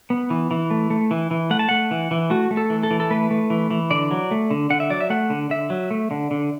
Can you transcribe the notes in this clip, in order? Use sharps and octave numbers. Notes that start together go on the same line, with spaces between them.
B3
E3
E3
A3
A3
E3
E3
A3 F#5
A5
A3 F#5
E3
E3
A3 F#4
A3
A4
E3
A4
E3
A4
A3 B4
A3
E3
E3
D3 D5
F#3
A3
D3
D3 F#5
E5
F#3 D5
E5
A3 F#5
D3
D3 E5
F#3
A3
D3
D3